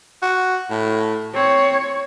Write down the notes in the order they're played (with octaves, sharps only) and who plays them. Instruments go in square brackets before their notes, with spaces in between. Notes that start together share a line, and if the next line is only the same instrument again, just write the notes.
[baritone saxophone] F#4
A2
[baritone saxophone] C4 [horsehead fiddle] C#5